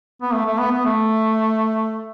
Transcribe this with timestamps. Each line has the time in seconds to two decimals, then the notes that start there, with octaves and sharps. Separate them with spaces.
0.22 B3
0.33 A3
0.46 A3
0.59 B3
0.72 B3
0.85 A3